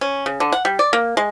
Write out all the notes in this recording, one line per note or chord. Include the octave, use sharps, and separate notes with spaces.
C#4
C#3
D3
F#5
G3
D5
A#3
G#3